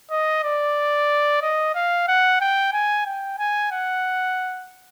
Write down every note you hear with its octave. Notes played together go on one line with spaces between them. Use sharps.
D#5
D5
D#5
F5
F#5
G5
G#5
G5
G#5
F#5